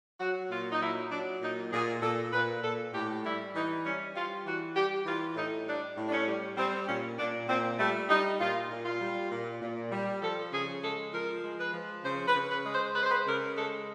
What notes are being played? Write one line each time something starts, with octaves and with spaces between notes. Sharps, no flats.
F#3 F#4
A#2 F4
D#4
F#3 E4
F#3 D4
A#2 D#4
A#2 G#4
A#2 A4
A#2 B4
A#2 A4
A2 G4
G3 E4
E3 D#4
G3 C#4
G3 F4
E3 F#4
G3 G4
E3 F4
A2 D#4
G3 D4
A2
D4
C#4
G3
G3 C4
A#2 C#4
A#2 D4
A#2 C4
G3 A3
G3 D#4
A#2 F4
A#2
F4
G3
A#2
A#2
G3
F3 A4
C#3 G#4
G#3 A4
F3 A#4
G#3
B4
F3
C#3 C5
B4
C#3
B4
G#3
C5
G#3 B4
C5
B4
C#3 A#4
G#3 A4